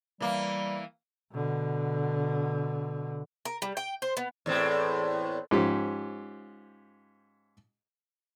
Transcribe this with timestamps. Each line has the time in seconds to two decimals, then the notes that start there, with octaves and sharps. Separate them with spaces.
0.20 E3 G3 A#3
1.33 B2 D3
3.45 A#4
3.62 G3
3.77 G5
4.02 C5
4.17 B3
4.46 E2 A2 C4
5.51 G#2 F3 C#4 G4